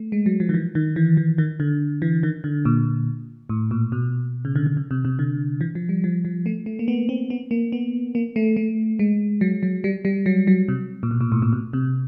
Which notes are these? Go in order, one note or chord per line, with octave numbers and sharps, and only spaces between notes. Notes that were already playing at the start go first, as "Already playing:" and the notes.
Already playing: A3
G#3
F#3
F3
D#3
E3
D#3
E3
E3
D#3
D3
E3
D#3
D3
A#2
A2
A#2
B2
C#3
D3
D3
C#3
C3
C3
D3
E3
F3
G3
F3
F3
A3
A3
A#3
B3
C4
B3
A#3
B3
A#3
A3
A3
G#3
F#3
F#3
G3
G3
F#3
F#3
C3
A#2
B2
A#2
A2
A#2
B2
C3